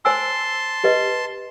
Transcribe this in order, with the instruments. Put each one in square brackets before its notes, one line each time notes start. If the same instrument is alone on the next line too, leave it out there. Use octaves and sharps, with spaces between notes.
[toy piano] C5 G#5 E6 [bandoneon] A5 C6
[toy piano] G4 B4 D#5